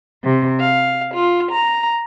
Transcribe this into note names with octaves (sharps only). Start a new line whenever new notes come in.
C3
F5
F4
A#5